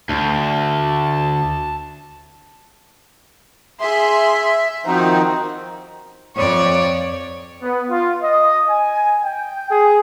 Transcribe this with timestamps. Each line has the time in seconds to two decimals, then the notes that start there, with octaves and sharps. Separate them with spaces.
0.09 D2 A5
3.81 G#4 E5 C6
4.86 D#3 F3 C4 D#4 F#4
6.36 F2 C#5 D5
7.60 B3
7.90 F4
8.23 D#5
8.68 G#5
9.22 G5
9.71 G#4